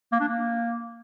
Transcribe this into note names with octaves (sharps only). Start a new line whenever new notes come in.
A#3
D4
A#3